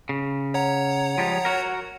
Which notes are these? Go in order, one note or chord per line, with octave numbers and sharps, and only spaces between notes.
C#3
C#5 F#5 A#5
F3 G3 G#3
F#4 A#4